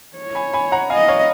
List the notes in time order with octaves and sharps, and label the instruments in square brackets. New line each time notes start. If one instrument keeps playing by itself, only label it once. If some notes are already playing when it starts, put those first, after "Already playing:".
[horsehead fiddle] C#5
[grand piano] G#5 B5
G#5 B5
F#5 A#5
[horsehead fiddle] D#5 [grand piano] F5 G#5
[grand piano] C#5 F5